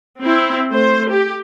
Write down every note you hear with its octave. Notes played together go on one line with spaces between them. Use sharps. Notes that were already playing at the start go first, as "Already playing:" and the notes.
C4 E4
A3 C5
G4